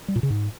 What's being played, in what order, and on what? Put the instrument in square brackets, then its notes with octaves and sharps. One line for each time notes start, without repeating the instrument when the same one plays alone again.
[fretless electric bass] G3
A#2
C#3
G#2